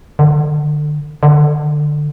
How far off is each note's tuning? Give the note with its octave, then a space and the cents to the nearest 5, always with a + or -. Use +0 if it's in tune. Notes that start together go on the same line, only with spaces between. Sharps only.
D3 +30
D3 +20